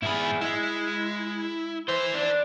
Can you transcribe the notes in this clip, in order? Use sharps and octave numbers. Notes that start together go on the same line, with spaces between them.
G#2 E4 G#4 B5
G#3 E4
B4 C5 E5
D4